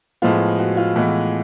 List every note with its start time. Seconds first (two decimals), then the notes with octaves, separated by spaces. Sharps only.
0.22 A2 F3 G#3 B3 F4
0.59 F#4
0.77 F4
0.96 A2 E3 G#3 B3